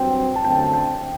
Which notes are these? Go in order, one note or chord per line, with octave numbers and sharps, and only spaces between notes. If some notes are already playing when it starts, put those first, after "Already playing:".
Already playing: G2 F#3 C4 G5
A5
F#2 D3 A3 C4 G5
A5
G5